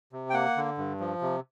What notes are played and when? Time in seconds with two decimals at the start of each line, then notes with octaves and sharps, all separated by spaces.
0.13 C3
0.30 G5
0.34 A#3 F#5
0.57 D3
0.78 G2
1.00 F3
1.21 C3